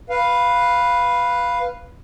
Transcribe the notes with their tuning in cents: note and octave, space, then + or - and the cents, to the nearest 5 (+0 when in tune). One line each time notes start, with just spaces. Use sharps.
B4 +0 F5 +0